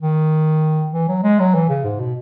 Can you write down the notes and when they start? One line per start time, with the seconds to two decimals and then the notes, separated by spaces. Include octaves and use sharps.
0.02 D#3
0.93 E3
1.09 F#3
1.23 G#3
1.39 F#3
1.55 E3
1.69 C#3
1.84 G#2
2.00 B2